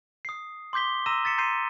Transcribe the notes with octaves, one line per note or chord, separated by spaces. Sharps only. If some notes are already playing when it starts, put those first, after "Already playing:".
D#6 C7
C6 D6 G6 B6 G7
A#5 C6 E6 A#6 D#7 E7
A6 B6 C#7 E7
A#5 C6 G6 C7 D#7